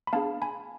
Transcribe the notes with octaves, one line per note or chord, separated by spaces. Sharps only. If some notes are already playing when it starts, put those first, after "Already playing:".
B5
B3 D4 G#4 F5 A5
G#5 B5